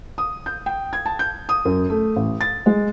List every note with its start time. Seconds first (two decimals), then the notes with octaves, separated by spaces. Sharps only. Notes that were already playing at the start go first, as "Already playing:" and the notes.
0.18 D#6
0.46 G6
0.66 G5
0.93 G#6
1.06 A5
1.19 G6
1.49 D#6
1.65 F#2
1.90 A3
2.16 A1
2.41 A6
2.66 G#3